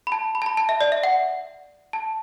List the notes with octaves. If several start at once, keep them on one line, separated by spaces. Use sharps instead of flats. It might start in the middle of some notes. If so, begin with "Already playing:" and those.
B5
A5
B5
A5
B5
A5
E5
D5
E5
F#5
A5